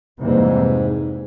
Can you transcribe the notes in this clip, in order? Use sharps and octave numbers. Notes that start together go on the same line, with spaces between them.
F2 G#2 C3 E3 G3 A#3